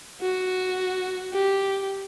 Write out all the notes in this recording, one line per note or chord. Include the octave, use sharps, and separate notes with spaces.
F#4
G4